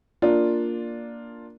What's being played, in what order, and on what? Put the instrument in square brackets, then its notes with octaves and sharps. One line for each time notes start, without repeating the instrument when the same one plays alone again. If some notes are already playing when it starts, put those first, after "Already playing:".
[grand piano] A#3 D4 F4